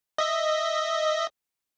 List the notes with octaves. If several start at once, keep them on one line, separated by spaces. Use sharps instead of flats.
D#5 E5